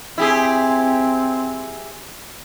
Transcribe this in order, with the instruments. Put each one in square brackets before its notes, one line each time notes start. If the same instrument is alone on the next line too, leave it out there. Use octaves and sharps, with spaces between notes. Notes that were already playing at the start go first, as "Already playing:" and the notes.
[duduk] C4 [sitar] E4 G4 G#4